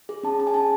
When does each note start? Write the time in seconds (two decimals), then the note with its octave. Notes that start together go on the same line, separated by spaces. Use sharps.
0.09 G#4
0.23 C#4 A5
0.39 G#4 A5
0.47 G#5
0.54 C#4 A5